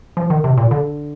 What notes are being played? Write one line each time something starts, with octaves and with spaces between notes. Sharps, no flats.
F3
D#3
C3
A#2
D3